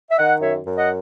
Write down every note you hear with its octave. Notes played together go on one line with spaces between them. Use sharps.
E5
D#3 D#5 F#5
F#2 C#5 E5
F#2
D#5 F#5